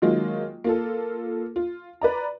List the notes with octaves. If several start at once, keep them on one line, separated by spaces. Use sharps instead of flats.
D#3 F#3 G#3 A#3 F4
A#3 F4 A4
F4
B4 D5 A#5